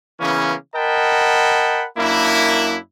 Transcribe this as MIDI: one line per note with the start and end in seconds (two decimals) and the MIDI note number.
0.21 0.55 49
0.21 0.55 52
0.21 0.55 58
0.21 0.55 59
0.21 0.55 61
0.76 1.86 70
0.76 1.86 75
0.76 1.86 78
0.76 1.86 79
0.76 1.86 81
0.76 1.86 83
1.98 2.77 42
1.98 2.77 58
1.98 2.77 62
1.98 2.77 64